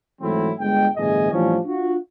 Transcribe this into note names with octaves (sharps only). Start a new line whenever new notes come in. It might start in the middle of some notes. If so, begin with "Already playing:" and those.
G#2 E3 F#3 A3 C4 E4
G1 G#3 G5
G1 A2 E3 G#4 D#5 G#5
A2 E3 F3 G3 C#4 D4
D4 F4 F#4